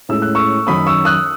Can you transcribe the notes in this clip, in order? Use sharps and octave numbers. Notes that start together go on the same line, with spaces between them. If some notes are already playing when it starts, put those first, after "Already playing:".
A2 G#3 C#4 E6
F#6
C#6 E6
F#2 D#3 F#3 C#4 B5 D#6
C#6 E6
D#6 F#6